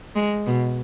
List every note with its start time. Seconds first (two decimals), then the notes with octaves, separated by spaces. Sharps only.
0.16 G#3
0.46 B2